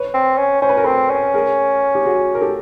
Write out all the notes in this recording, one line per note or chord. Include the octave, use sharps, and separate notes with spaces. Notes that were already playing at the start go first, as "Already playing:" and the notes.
Already playing: B4 C#5
C4
C#4
C#4 C5
B4
A#4
C4 A4 B4
C#4
G#4 A#4
G4
F#4 G#4
A#4
G4 A4